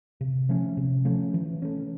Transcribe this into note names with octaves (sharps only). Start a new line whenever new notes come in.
C3
F3 A3 C#4
C3
F3 A3 C#4
E3
A3 C#4